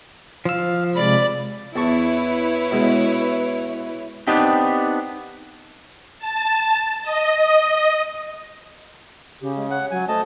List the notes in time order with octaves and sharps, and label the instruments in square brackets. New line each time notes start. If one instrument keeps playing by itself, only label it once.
[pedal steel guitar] F3 E6 [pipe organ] F5
[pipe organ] C3 G#3 [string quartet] D5 B5
[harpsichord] E2 A5 C#6 [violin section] E4 B4 C#5
[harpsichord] B2 G#3
[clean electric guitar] B3 C4 D4 D#4 G4
[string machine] A5
D#5
[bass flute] C#3 [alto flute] G4
[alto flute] G#3
[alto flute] C#5 [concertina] F#5
[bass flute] F#3 [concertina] G#5
[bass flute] A3 [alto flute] C5 [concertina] D#5 A5